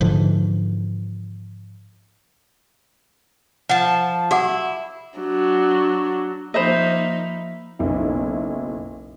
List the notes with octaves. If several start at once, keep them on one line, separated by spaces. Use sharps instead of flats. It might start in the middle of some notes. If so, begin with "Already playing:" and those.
G#2 D3 E3 F3
F3 F#5 A5
E4 F#4 F#5 D6
F#3 D4
F3 A#3 D#4 C5 D#5 E5 A#5 B5
F#1 B1 E4